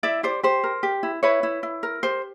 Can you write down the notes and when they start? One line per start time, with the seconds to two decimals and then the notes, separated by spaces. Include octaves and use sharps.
0.03 E4 D5 E5
0.23 G4 C5 D5
0.43 G4 C5
0.64 A#4
0.83 G4
1.03 E4
1.23 E4 B4 C#5
1.43 E4
1.63 E4
1.83 A#4
2.03 G4 C5